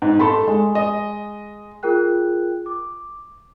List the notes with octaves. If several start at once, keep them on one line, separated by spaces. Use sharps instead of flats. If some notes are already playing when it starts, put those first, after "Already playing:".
G#2
A3 A4 B5 C6
G#3
D#5
F4 G#4 A#4 G5 F#6
D6